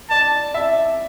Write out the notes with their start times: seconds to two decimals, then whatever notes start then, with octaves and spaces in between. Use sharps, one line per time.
0.10 D5 A5
0.54 E5